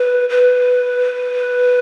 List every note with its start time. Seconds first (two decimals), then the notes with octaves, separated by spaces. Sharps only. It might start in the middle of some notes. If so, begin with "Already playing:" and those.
Already playing: B4
0.29 B4